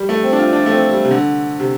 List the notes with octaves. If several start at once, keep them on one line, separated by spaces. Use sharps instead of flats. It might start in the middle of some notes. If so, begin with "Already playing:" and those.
Already playing: G3
A3
C4
D4
F4
D4
A3
C4
G3
C3
D3
C3